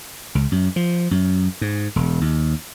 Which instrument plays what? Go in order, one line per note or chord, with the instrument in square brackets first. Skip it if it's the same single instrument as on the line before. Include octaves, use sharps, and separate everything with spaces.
[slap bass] C#2
F#2
F3
F#2
G#2
E1
D#2